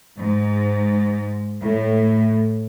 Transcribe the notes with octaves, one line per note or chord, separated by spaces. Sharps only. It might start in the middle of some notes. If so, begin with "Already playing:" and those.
G#2
A2